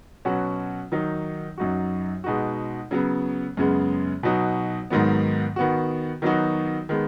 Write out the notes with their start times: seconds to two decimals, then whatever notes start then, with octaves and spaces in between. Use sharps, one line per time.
0.25 B2 F#3 C#4 F#4
0.92 D#3 F#3 D#4
1.58 F#2 F#3 D#4 F#4
2.24 B2 G#3 D#4 F#4
2.91 C#3 F#3 B3
3.57 F#2 C#3 G#3 B3
4.23 B2 F#3 D#4 F#4
4.90 G#2 D#3 F#3 B3
5.56 D#3 B3 F#4
6.22 D#3 F#3 B3 D#4 F#4
6.89 D#3 G#3 B3